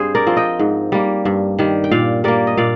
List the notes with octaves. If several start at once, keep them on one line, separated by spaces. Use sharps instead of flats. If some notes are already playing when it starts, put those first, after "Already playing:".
Already playing: G2 C4 G#4 C5
A#4 D5
F3 C4
D#5 G5
G#2
G3 A#3
G2
D#3 G3
G5
A#2 D5 F5
G3 A#3 A#4 D5
D#5
A#2 D5 F5